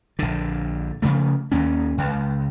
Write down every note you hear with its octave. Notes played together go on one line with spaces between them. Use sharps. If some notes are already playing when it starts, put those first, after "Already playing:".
A#1 D3
C#3 F3 A3
D#2 A#3 C#4
C#2